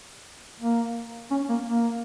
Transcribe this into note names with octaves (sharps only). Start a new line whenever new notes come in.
A#3
C#4
A#3
A#3